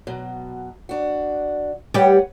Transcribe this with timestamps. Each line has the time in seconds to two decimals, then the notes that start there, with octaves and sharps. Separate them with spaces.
0.07 B2 F#3
0.89 D4 F#4
1.94 G3 G4 B4 C#5 F#5